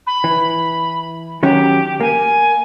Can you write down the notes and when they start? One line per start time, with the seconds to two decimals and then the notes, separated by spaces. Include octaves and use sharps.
0.06 B5
0.24 E3
1.43 D#3 F#3 C#4 G4
2.01 A#3 G#5